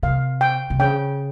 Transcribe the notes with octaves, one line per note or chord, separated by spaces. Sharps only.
C3 F5
G5
C3
C#3 G5